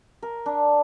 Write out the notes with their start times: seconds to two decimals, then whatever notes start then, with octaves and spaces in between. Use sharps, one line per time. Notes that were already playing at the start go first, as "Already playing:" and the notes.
0.22 A#4
0.46 D4